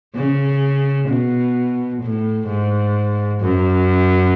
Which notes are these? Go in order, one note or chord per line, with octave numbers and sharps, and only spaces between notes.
C#3
B2
A2
G#2
F#2